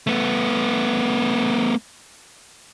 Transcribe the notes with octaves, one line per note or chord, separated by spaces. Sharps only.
A3 B3